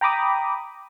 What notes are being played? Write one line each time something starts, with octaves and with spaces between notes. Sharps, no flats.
G5 A#5 B5 D6 D#6